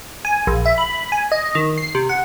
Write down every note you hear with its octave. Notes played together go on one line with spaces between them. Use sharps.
G#5
A#1
E5
B5
G#5
D#5
D#3
C7
C3
F#5